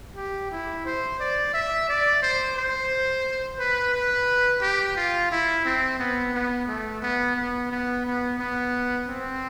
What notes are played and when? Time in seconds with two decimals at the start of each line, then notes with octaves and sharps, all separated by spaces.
0.16 G4
0.51 E4
0.86 C5
1.20 D5
1.54 E5
1.88 D5
2.22 C5
2.56 C5
3.59 B4
3.94 B4
4.62 G4
4.96 F4
5.31 E4
5.65 C4
5.99 B3
6.34 B3
6.68 A3
7.02 B3
7.36 B3
7.71 B3
8.05 B3
8.39 B3
9.08 C4